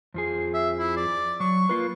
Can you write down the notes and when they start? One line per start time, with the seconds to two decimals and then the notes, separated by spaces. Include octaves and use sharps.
0.14 F2 F3 G#4
0.54 E5
0.79 E4
0.96 D5
1.40 F#3 C#6
1.69 A#3 F4 B4